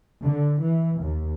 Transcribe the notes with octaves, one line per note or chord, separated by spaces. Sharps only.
D3
E3
D#2